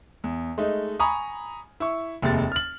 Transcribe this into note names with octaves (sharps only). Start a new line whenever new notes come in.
E2
G#3 A3 D#4
G#5 A#5 B5 C#6 D#6
E4 C#6
F1 D#2 C3 G#3 A6
F6 F#7